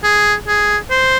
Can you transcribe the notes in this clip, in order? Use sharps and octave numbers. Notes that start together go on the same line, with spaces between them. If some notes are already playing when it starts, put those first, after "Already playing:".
G#4
G#4
C5